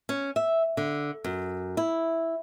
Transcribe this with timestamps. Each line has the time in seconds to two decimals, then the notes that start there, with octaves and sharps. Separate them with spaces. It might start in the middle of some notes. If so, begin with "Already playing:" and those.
0.09 C#4
0.36 E5
0.77 D3
1.24 F#2
1.77 E4